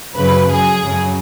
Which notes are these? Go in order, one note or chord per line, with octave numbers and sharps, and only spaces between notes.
F#2 C#3 F#3 B4
F#2 F#3 G#4
F#2 C#3 F#3